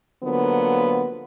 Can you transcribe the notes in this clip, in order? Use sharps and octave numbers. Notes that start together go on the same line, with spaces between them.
D3 F3 F#3 A#3 B3